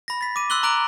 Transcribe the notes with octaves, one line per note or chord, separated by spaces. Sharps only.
B5 A#6
A6 B6
D6 D#7
C6 E6 F#6 F#7 G7
A#5 D6 F#6 D7 F#7